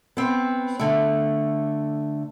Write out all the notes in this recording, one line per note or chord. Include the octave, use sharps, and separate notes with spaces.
B3 C4
D3 A3